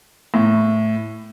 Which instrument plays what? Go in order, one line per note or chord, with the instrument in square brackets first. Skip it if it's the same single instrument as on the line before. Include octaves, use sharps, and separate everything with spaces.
[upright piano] A2